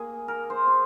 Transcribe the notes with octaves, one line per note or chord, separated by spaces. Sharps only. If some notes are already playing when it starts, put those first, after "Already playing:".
Already playing: A#3 G#4
A#4
C5
G#4